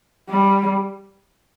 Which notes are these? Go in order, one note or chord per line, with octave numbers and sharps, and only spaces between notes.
G3